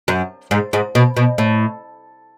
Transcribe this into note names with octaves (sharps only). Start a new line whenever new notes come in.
F#2
G#2
G#2
B2
B2
A2